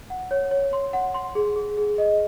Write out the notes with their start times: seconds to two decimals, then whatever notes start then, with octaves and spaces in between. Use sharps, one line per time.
0.10 F#5
0.31 C#5
0.51 C#5
0.73 C6
0.93 F#5
1.14 C6
1.35 G#4
1.56 G#4
1.77 G#4
1.98 D#5